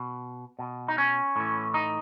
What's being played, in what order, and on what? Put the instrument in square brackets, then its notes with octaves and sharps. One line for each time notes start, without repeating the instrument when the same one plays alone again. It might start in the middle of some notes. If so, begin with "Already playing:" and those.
Already playing: [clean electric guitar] B2
B2
D#4
C#4
A2 E3
D#4